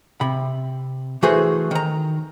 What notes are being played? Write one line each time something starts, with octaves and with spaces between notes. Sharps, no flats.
C3 B5
E3 A3 F#4 G#4 B4 C5
D#3 A#5